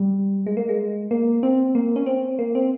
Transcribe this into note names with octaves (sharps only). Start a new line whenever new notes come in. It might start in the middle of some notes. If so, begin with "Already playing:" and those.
Already playing: G3
G#3
A#3
G#3
A#3
C4
A#3
C#4
C4
A#3
C4